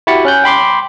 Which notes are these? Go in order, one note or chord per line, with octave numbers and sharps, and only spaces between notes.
E4 F#4 G4 B5 A6 C#7
C#4 F#6 G6
G5 B5 C6 D6